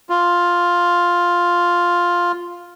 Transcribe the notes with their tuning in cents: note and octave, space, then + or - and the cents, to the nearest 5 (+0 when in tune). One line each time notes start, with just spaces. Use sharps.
F4 +5